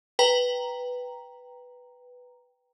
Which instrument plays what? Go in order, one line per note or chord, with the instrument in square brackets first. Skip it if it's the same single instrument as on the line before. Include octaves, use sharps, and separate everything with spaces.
[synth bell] B4 G5 A#5